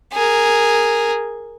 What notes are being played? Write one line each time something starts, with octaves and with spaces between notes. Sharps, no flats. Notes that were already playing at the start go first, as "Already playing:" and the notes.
G#4 A#4